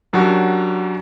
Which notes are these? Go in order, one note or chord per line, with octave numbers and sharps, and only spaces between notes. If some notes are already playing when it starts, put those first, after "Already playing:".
F#2 F#3 D4 F#4 G4